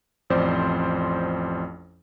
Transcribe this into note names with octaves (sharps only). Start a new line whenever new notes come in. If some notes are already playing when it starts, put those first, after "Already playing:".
A1 F2 C5 D5 C6